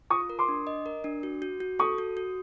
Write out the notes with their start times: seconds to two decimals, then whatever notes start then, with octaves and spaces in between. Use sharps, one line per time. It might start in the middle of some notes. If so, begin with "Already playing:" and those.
0.10 F4 C#6 D#6
0.29 A#4
0.39 C6 D6
0.48 D4
0.67 D#5
0.86 A#4
1.04 D4
1.23 F#4
1.42 F#4
1.60 F#4
1.79 A4 C#6 D#6
1.98 F#4
2.17 F#4